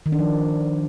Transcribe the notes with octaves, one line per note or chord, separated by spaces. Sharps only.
D#3
D4
F3